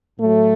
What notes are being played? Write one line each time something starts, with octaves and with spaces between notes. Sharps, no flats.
A2 F#3 A3